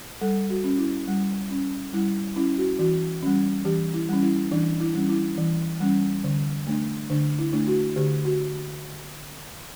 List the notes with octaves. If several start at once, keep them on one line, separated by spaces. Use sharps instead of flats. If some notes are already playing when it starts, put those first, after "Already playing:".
G3 A4
F#4
C#4
E4
G3
C#4
G3 E4
C#4 E4
F#4
E3 F#4
G3 C#4
E3 G4
E4
G3 C#4
E4
E3 D4
E4
G3 C#4
E4
E3
G3 C#4
D3
A3 D4
D3 D4
E4
A3 D4
F#4
D3 G4
F#4